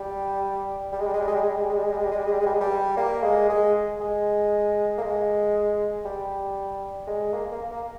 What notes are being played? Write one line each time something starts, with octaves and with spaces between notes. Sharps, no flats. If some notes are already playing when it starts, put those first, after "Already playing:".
Already playing: G3
G3
G#3
G3
G#3
G3
G#3
G3
G#3
G3
G#3
G3
G#3
G3
G#3
G3
G#3
G3
G#3
G3
G#3
G3
G#3
G3
G#3
G3
A#3
G#3
G#3
G#3
A#3
G#3
G3
G#3
A#3
A#3
A#3